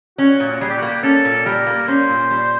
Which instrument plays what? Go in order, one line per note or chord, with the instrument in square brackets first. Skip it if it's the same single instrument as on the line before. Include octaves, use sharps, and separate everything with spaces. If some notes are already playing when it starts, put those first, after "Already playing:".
[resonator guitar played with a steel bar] C#4 [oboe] F#4
[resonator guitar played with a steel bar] A#2
[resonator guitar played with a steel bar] G3 [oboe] G#4
[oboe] G4
F#4
[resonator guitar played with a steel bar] A#3
[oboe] G4
[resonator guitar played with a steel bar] C#4 [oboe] A4
[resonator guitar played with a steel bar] A#2
[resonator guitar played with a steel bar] G3 [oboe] A#4
[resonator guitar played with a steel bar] A#3
[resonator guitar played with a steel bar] C#4 [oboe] C5
[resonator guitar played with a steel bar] A#2
G3